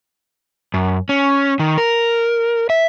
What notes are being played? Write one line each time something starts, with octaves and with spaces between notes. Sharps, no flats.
F#2
C#4
D#3
A#4
E5